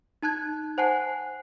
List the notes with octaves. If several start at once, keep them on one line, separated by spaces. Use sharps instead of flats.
D#4 A5 F#6 G#6
C5 F#5 G#5 A5 F#6 C7